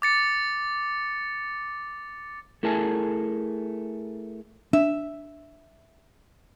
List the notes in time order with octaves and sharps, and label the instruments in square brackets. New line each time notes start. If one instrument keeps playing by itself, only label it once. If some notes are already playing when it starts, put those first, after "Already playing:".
[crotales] D6 A6 C#7
[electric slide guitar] A3 E4 G#4 A#4 G#5 A5
[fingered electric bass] D4 [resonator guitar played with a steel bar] E5